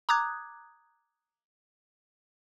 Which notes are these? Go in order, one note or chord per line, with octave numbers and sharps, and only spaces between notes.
A#5 D6 D#6 F#6 G#6